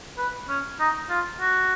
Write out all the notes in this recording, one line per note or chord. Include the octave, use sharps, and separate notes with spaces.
B4
C#4
D#4
F4
F#4